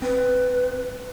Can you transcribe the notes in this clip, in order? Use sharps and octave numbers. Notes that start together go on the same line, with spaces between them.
C4 B4